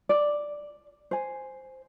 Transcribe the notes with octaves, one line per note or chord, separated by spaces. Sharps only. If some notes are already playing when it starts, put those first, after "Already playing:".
D5
C5 G#5